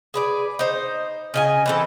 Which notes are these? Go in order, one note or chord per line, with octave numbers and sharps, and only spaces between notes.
G#4 B4 D5
D#4 C5
C#3 D#5 G#5
E3 C4 A4